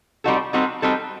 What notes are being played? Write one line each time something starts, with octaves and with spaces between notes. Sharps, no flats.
G3 C4 D#4 F#4 A4
G3 C4 D#4 F#4 A4
G3 C4 D#4 F#4 A4